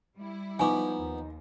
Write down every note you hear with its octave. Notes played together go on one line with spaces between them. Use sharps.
G3 E4
F3 B3 D#4 G#5 C#6 D6
D#2